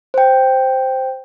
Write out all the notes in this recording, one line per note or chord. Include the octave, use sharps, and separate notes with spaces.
C5 G5